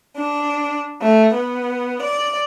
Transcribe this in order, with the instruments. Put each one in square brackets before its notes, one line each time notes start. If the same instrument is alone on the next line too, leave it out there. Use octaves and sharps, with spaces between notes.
[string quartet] D4
A3
B3
D5